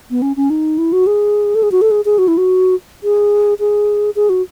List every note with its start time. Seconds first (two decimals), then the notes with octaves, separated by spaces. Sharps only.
0.11 B3
0.22 C#4
0.37 C#4
0.50 D#4
0.78 E4
0.92 F#4
1.07 G#4
1.55 A4
1.63 G#4
1.72 F#4
1.82 A4
1.91 G#4
2.05 G#4
2.18 F#4
2.28 E4
2.38 F#4
3.03 G#4
3.60 G#4
4.16 G#4
4.29 F#4